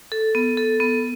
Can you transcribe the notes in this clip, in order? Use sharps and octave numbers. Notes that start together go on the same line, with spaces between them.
A4
B3
A4
B3